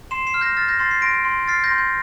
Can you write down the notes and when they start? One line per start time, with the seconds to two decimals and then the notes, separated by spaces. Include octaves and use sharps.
0.11 C6 C7 E7
0.27 C7 E7
0.34 F6
0.41 G6 A#6
0.57 F6 A6
0.68 G6 A#6
0.79 C6 A6 C7
0.91 A6 C7
1.02 C6 A#6 D7
1.25 C6
1.48 F6 A6 C7
1.64 G6 A#6
1.70 C6
1.78 G6